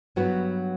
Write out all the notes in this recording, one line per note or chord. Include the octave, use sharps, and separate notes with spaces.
G2 F#3 B3 F#4 B4